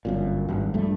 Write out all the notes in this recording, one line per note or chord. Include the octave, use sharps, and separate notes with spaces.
G1 F#2 A#2
G#1 G2
A#1 G2 A3